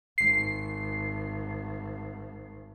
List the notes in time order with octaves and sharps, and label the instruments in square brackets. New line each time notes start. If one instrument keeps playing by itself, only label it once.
[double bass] G#1 [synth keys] C7